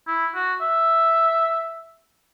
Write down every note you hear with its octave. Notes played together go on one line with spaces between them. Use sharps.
E4
F#4
E5